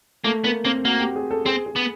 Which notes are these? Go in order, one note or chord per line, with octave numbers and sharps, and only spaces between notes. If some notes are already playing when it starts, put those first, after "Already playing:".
A3 A#3
A#3 B3
A#3 C4
A#3 F#4
G4
G#4
A4
C4 G#4
G#4
B3